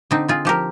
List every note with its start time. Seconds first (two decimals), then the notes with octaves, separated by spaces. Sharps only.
0.11 D3 C4 D#4
0.28 C4 F4 G#4
0.45 F3 G4 A#4